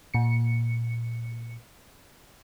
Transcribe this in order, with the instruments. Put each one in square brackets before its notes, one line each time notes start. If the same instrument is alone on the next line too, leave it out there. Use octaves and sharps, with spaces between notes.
[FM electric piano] A#2 C#7